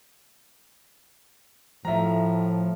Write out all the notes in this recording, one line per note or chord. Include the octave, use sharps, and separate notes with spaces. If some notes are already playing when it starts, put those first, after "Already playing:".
A2 F3 E5 A#5